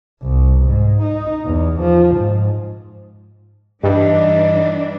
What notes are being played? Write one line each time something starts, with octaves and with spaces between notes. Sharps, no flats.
C2
G#2
D#4
E2
F3
G#2
G2 E3 G3 D4 D#4